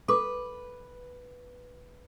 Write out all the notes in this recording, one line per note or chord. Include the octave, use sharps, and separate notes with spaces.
A4 B4 D6